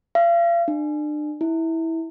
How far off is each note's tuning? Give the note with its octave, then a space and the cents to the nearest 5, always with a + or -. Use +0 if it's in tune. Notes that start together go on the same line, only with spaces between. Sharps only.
F5 -40
D4 +35
E4 -15